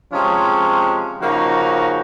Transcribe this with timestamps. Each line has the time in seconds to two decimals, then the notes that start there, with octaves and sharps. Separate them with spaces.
0.12 C3 F3 G#3 C#4
1.21 C#3 F3 A#3 D#4 F#4